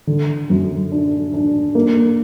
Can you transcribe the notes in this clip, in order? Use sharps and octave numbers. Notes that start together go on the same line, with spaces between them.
D3
F#2
D4
D4
A#3